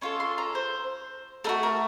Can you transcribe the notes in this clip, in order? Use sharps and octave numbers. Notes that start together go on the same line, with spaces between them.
C#4 F4 A4 C#6
C6
A#5
C5
A3 D#4 F#4 A#4
A#4